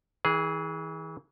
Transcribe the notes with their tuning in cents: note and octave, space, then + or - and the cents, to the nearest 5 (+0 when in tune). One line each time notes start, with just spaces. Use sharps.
E3 -35 G#4 +0